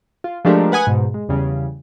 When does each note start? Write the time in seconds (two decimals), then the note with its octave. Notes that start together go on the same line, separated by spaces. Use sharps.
0.24 F4
0.45 F3 G#3 A3 D4 G4 A#4
0.72 B4 F#5 G#5 D#6
0.87 G#2 B2
1.14 G#3
1.29 E2 C#3 G3